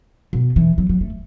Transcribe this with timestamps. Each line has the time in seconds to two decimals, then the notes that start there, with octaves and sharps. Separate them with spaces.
0.33 B2
0.56 E3
0.78 F#3
0.89 F#3
1.01 A3